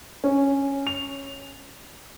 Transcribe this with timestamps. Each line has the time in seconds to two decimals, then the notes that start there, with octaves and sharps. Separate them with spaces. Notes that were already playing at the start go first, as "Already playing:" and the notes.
0.24 C#4
0.87 F7